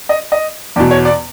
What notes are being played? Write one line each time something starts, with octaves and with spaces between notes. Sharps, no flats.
D#5
D#5
E2 B2 D5
C#5
D5